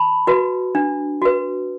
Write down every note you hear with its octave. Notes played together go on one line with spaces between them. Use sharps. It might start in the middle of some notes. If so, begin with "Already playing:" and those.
Already playing: A5 B5
F#4 B4
D4
F#4 B4